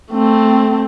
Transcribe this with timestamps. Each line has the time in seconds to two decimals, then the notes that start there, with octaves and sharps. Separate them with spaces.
0.11 A3 C4